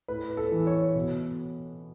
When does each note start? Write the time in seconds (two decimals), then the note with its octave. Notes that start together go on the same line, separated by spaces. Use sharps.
0.08 A2 B4
0.37 A4
0.52 E3
0.67 C#5
0.95 B2